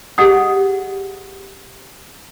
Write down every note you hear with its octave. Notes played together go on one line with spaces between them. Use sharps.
G4 G#4 D#5 F#5 D#6